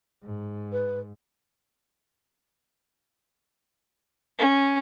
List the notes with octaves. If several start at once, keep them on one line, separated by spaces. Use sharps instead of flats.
G#2
B4
C#4